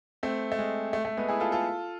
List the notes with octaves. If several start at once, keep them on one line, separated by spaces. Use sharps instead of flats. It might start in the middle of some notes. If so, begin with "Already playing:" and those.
A3 C4
A3
G#3
A3
A3
G#3 B3
E4 G#4
F4 A4
F4 A4